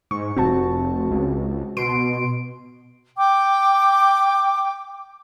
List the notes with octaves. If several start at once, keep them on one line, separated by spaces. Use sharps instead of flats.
G#2 C#6
F1 C4 F#4 A5
C#2
B2 C6 D7
G5 D6